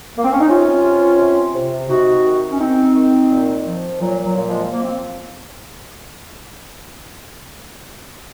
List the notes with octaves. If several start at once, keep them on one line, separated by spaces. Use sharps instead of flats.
A#3
C4
C#4
D#4
C3 C#4 F4
C3
C3
C3
C3 D#4 F#4
D#3
C#4
D#3 C4 D#4
D#3
A#2
F3
A#2 F#3
F#3
A#2
F3 G#3
F3 A#3
C4